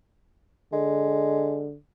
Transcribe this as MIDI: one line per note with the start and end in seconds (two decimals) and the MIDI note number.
0.73 1.76 50
0.73 1.67 56